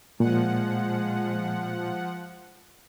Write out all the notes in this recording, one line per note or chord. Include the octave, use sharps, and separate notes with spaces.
A#2 F3 G#3 F#5